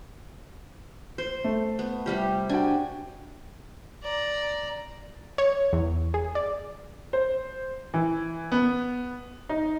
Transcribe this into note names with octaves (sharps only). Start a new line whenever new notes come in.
C5
A3
B3
C3 G3 G4
D4 F#4 G5 G#5
D5 A#5
C#5
E2
G#4
D5
C5
E3
B3
D#4